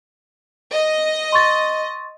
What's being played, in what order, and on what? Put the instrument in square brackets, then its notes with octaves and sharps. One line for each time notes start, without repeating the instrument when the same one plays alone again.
[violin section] D#5
[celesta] C6 C#6 A6